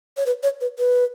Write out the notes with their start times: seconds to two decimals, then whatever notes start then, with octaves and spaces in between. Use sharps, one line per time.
0.17 C#5
0.26 B4
0.43 C#5
0.61 B4
0.78 B4